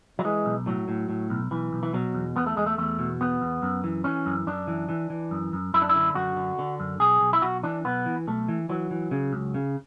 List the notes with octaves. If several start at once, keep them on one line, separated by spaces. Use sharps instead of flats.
F#3
E3 G#3
B1
A2 F#3
A2
A2
B1
B1 E3
B1
E3
B2 F#3
E2
E2 B3
A3
E2 G#3
A3
E2 A3
B2
E2 B3
E2
F#2
E3
E3 C#4
F#2
F#2 D4
E3
E3
E3
F#2
F#2
F#2 E4
D4
E4
D3
F#2 F#4
D3
D3
F#2
B1 G#4
B1
E4
B1 F#4
E3 D4
B1 B3
E3
B1 A3
E3
E3 F#3
E3
C#3
C#2
C#3